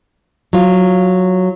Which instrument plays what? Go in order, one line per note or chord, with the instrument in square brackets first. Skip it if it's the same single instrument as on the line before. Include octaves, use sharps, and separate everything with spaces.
[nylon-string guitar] F#3 F4